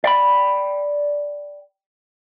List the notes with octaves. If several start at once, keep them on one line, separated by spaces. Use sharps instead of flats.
D5 G5 B5